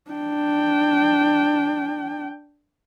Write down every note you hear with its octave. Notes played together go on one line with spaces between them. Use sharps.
D4 G5